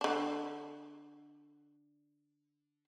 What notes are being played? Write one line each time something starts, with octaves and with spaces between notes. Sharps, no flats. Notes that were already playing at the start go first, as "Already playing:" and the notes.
D3 D4